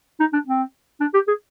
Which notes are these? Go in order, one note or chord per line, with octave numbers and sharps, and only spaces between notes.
D#4
D4
C4
D4
G4
G#4